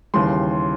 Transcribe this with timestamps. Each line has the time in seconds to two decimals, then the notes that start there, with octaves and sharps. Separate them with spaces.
0.14 D#2 C#3 E3 G3 C6